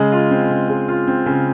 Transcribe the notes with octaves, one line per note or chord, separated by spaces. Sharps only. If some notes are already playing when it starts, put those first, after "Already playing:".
Already playing: C#3 G#3
F4
C4
C#3
G#3
F4
C4
C#3